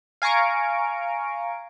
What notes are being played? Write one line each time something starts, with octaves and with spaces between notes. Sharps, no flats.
F5 G#5 A#5 C#6 D7